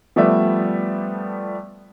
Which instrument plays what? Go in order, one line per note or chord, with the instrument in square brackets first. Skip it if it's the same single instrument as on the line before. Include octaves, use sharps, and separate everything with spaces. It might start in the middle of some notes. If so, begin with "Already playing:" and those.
[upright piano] F3 G3 A3 B3 D5 E5